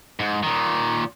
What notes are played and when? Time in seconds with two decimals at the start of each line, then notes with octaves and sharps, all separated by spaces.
0.19 G#2
0.43 A#2 D#3